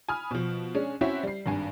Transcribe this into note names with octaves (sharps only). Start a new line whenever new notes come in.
G#5 B5 D#6 F6
B2 F3
G#3 C#4 D4 G#4
C4 C#4 E4 F#4 C5 E5
G3 C7
G#1 G2 G#5